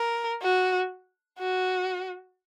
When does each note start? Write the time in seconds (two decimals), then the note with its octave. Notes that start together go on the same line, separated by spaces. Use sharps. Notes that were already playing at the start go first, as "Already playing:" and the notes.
Already playing: A#4
0.42 F#4
1.39 F#4